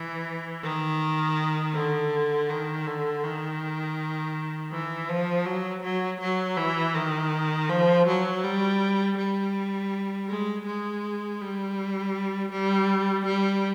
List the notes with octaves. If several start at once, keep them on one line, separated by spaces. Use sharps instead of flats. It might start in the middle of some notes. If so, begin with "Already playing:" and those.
Already playing: E3
D#3
D3
D#3
D3
D#3
E3
F3
F#3
F#3
F#3
E3
D#3
F3
F#3
G3
G3
G#3
G#3
G3
G3
G3